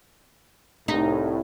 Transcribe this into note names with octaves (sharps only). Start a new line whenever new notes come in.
C2 A2 D#4